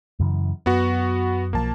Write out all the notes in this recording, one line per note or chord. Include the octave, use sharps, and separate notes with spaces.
F#2 C#3 E3
F#2 B3 F#4
B1 F3 A#3 A5